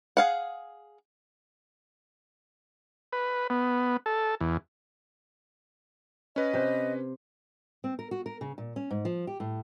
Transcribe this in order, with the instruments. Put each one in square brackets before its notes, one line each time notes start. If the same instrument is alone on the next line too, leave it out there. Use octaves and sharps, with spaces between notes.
[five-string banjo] G#4 F5 F#5
[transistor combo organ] B4
B3
A4
E2
[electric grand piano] C#4 B4 [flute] D#5
[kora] C3 C5
[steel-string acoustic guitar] C4
A#4
F#4
A#4
C#3
A#2
C#4
G#2
F3
G4
A2